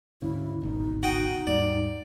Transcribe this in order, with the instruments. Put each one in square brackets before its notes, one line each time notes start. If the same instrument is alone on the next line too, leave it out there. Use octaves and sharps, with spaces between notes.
[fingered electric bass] D2 G#2 C#3 [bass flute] E4
[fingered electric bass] D1 G#1 B2 [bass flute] D#4
[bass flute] D#4 [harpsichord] F#4 G5 D#6
[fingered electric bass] D#2 G#2 G3 [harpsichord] D5